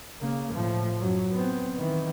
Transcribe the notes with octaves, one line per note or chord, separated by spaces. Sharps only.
C#3 A#3
A2 F3
F#2 F#3
B3 C4
D#3 E3